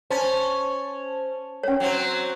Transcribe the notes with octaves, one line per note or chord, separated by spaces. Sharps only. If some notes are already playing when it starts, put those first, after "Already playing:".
C#4 C5 A5
C#4 C#5
F#3 C4